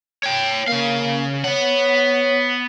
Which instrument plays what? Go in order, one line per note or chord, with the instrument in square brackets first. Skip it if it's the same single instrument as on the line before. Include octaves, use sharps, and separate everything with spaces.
[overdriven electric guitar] C#5 G5
[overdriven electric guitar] C#3 F5 [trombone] A#3
[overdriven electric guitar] B3 F#5 [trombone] C#5